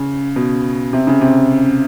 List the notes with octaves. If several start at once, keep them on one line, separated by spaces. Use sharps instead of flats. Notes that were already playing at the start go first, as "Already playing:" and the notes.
Already playing: C#3
B2
C3
C#3
C3